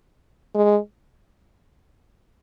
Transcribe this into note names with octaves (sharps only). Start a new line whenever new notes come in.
G#3